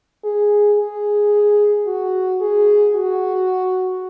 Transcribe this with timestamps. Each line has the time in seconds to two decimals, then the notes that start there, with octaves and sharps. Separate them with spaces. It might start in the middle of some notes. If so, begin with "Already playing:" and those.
0.24 G#4
0.78 G#4
1.87 F#4
2.41 G#4
2.95 F#4